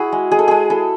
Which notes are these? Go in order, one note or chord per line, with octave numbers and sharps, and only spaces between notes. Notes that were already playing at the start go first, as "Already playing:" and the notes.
Already playing: E4 F#4 G#4
G#3
G#3 G#4
A4
G#3 G#4
E4 A4